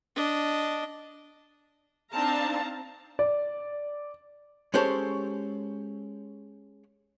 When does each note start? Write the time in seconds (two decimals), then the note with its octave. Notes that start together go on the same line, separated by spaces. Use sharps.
0.15 D4 D#5
2.12 C4 D4 D#4 F5 A5 A#5
3.19 D5
4.74 G#3 C#4 G4 A4 C5 C#5